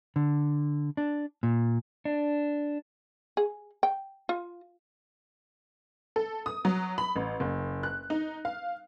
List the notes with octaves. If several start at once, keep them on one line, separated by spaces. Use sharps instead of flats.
D3
D4
A#2
D4
G#4
G5
F4
A4
D#6
F#3
B5
A1
F#1
F#6
D#4
F5